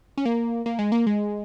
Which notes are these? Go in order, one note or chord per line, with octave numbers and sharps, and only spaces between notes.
C#4
A#3
A#3
G#3
A#3
G#3